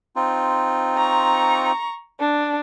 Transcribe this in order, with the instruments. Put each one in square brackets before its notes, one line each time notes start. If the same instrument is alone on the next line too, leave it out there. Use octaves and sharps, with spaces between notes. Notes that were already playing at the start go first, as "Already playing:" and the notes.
[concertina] C4 D#4 F4
[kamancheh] A#5 C#6
D4